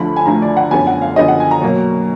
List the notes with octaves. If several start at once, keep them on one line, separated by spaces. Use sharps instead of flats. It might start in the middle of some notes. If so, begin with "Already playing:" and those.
Already playing: D2 D3 F3 B5
G#5
D2 D3 F3 A#5
D5
F#5
F#2 D3 F3 B3 G#5
F#5
F5
F#2 D3 F3 B3 D#5
F#5
G#5
A#5
B2 F#3 A#3